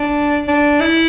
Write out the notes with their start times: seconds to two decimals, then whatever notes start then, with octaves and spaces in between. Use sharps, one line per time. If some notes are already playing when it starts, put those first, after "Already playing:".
Already playing: D4
0.48 D4
0.80 E4